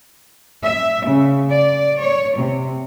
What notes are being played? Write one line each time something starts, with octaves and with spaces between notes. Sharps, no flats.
E5
C#3
D5
C#5
C3